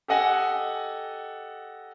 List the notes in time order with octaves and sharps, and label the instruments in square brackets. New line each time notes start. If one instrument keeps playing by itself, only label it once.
[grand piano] G4 A4 D#5 F#5 G#5